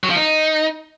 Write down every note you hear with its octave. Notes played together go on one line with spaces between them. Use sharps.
F#3
F3
D#4